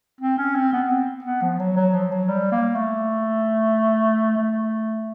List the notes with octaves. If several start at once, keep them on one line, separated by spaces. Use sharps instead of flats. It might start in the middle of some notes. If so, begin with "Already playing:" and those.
C4
C#4
C4
B3
C4
B3
F3
F#3
F#3
F3
F#3
G3
A#3
A3
A3